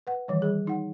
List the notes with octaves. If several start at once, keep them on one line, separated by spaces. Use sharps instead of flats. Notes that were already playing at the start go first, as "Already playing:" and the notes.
B4 F#5
D#3 E3 G3
G3 G#4
D#4 F#5